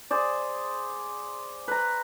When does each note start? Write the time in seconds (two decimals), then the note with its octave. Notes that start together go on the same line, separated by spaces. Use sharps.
0.11 G#4 C5 D5
1.68 B4 A#5